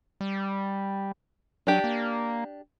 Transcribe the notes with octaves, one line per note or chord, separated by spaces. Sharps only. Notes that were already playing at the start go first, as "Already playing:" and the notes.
G3
F#3 D4 G4
A#3